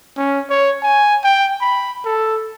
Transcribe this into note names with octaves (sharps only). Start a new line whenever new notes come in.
C#4
C#5
G#5
G5
B5
A4